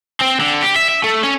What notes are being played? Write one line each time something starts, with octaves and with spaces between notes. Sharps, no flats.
C4
D3
G4
E5
E5
A3
C#4